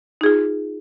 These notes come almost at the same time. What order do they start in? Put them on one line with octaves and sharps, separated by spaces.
D#4 G#4 F4